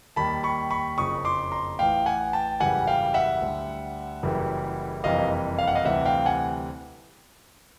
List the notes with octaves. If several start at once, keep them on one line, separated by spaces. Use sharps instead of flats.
D#2 D#3 G3 A5 B5
B5 C#6
B5 C#6
F#1 F2 C#3 F3 C#6 D#6
C6 D6
A#5 C6
A1 A2 E3 F5 G5
F#5 G#5
G5 A5
G#1 F#2 C#3 E3 G3 F#5 G#5
F5 G5
E5 F#5
D2 D3 G3
F#1 F#2 C#3 E3 G3
F#1 F2 C3 E3 G3 D#5 F5
F5
F#5
D#5 F5
D2 C3 E3 G3 E5 F#5
F5 G5
F#5 G#5